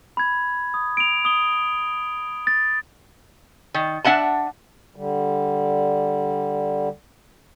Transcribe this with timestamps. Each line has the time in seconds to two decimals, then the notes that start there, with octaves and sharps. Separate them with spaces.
0.17 B5 G#6
0.74 D#6
0.97 D7 F7
1.25 D#6 G7
2.47 A6
3.74 D#3
4.05 D4 E5 F#5 A5
4.96 D3 G3